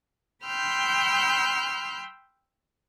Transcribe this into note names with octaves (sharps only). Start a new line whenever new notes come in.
G5 B5 C6 E6 F6 G6